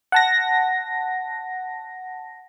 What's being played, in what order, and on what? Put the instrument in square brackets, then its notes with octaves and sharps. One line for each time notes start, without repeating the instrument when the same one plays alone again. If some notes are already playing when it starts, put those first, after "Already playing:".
[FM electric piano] F#5 A5 A#6